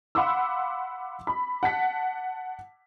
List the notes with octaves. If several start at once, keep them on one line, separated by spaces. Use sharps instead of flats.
F5 F#5 B5 C6 D6 E6
B5
F#5 A5 B6